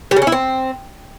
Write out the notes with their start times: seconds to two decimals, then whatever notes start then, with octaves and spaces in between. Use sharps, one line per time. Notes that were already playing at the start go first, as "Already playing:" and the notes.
0.11 G3
0.16 C#3
0.22 C#4
0.27 E4
0.32 C4